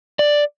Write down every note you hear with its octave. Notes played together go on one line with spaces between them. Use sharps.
D5